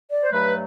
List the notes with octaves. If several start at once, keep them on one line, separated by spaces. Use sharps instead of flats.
D5
C5
G2 F#3 A3 B4